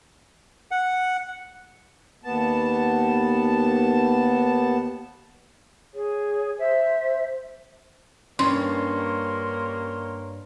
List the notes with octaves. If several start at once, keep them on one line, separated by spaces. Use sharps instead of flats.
F#5
D#2 B3 A5
G#4 C#5
C5 E5
G2 G3 A#3 C#4 C#5 C6